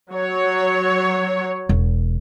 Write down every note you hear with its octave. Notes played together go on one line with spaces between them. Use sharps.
F#3 C#5
E1